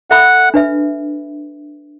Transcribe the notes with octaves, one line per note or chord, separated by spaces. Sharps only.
A4 E5 F#5 B5
D4 B4 E5